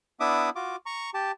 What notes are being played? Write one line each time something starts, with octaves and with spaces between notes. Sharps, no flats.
B3 D4 E4 E5 D6 D#6
F4 F#4 D6
A#5 C#6
G4 A5